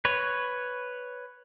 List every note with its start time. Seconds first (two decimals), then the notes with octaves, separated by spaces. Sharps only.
0.05 B4 C#5